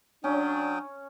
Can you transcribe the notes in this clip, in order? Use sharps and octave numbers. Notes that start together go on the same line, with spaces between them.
F#3 C#4 D4 G5 D#6